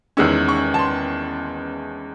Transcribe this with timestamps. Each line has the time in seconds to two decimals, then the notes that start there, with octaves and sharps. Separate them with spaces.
0.17 E2 D#3 G#3 C#4 E6
0.49 C#6
0.74 A5
0.79 C6